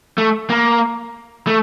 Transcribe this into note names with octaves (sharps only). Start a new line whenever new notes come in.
A3
A#3
A3